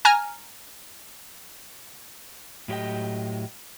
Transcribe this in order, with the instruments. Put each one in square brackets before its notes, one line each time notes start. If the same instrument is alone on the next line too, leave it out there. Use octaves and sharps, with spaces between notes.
[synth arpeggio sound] G#5 A#5 F6
[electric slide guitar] A2 F#3 G4 D5 D#5 G5